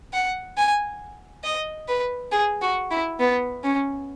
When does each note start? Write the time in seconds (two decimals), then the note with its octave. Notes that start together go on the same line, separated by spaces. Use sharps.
0.13 F#5
0.57 G#5
1.44 D#5
1.88 B4
2.32 G#4
2.62 F#4
2.91 E4
3.20 B3
3.64 C#4